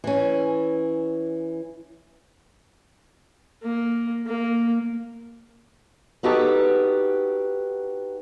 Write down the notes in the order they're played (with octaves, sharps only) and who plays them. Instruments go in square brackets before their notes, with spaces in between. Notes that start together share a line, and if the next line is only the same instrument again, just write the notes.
[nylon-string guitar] E3 C#4
[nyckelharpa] A#3
A#3
[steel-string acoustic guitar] B3 D#4 F#4 G4 A4